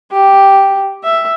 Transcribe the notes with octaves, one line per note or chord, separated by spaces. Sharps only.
G4
E5